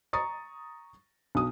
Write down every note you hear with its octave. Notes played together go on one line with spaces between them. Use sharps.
A#5 C#6 D#6 A6
B1 D#6